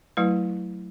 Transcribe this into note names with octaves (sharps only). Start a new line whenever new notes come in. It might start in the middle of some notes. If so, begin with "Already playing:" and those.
F#3 A3 E4 B4